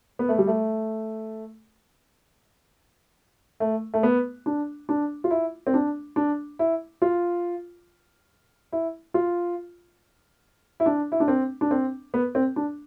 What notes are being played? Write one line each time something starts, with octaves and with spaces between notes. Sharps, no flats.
B3
A3
G3
A3
A3
A3
B3
D4
D4
F4
E4
C4
D4
D4
E4
F4
E4
F4
E4
D4
E4
D4
C4
D4
C4
B3
C4
D4